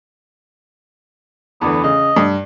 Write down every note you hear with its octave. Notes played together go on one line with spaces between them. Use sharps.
E2 D3 E3 B3
C#3 D#5
G2